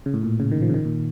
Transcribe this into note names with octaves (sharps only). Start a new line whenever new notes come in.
C#3
A2
A#2
C#3
D#3
F3
C#3
D#3
A#2